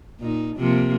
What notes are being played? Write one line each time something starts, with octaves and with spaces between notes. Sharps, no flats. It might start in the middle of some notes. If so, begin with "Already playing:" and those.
A#2 D#4
C3 F3 A#3